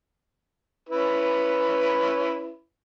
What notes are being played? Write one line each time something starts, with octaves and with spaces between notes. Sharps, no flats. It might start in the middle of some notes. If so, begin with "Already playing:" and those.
C#4 E4 B4